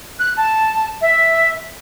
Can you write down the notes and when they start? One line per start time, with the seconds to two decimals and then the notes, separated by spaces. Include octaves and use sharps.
0.19 F#6
0.37 A5
1.01 E5